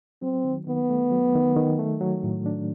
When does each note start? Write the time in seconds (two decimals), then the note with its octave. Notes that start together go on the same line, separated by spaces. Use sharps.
0.22 F#3 C4
0.44 D#3
0.67 D#3 B3
0.90 A3
1.11 F#3
1.35 D#3
1.56 D#3
1.79 A3
2.01 F#3
2.24 A2
2.46 D4